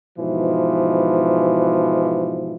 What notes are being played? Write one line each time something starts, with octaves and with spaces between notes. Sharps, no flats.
G#2 B2 E3 F3